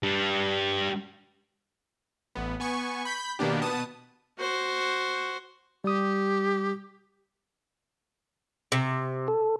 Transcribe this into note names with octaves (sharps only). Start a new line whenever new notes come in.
G3 D4
A1 B3
B3 G#5 C#6
B5 G6 B6
B2 D#3 A#3 B3 D4 G4
B2 B3 A5 D#6
F#4 C5
G3 G4 D#6
C3
A4